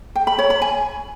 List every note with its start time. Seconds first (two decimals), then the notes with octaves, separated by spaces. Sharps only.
0.15 G5
0.27 B5
0.39 C#5
0.50 B5
0.62 G#5